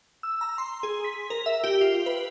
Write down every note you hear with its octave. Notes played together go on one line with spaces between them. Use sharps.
E6
A#5
C6
G#4
B6
A#4
E5
G4
F4
B4